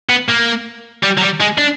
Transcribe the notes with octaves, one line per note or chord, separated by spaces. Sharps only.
B3
A#3
G3
F#3
G3
G#3
D4